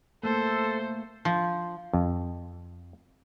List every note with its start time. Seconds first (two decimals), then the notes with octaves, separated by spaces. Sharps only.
0.23 A3 A#3 A4 C5
1.25 F3
1.93 F2